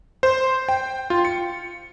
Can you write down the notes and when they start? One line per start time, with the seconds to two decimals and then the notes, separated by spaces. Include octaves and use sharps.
0.23 C5
0.69 G5
1.10 F4
1.25 C#7